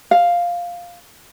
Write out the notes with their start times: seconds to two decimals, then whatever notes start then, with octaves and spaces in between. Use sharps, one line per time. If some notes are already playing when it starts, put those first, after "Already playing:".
0.11 F5